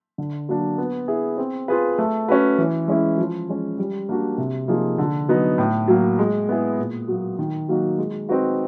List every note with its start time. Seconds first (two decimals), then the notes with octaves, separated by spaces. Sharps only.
0.18 D3
0.49 F#3 A#3 D4
0.78 B3
1.08 E4 G#4
1.38 C4
1.68 F4 G#4 B4
1.98 A3
2.29 C#4 F#4 B4
2.58 E3
2.88 G#3 C#4 E4
3.18 F3
3.49 G#3 C#4
3.78 G3
4.09 A#3 D4 F#4
4.38 C3
4.68 F3 A#3 D#4 G#4
4.98 D3
5.28 F#3 B3 D#4
5.58 A2
5.88 F#3 A#3
6.19 G#3
6.49 B3 E4 G#4
6.78 A#2
7.08 F#3 A#3
7.39 D#3
7.69 F#3 A#3 D#4 F#4
7.98 G#3
8.29 C4 D#4 F#4 B4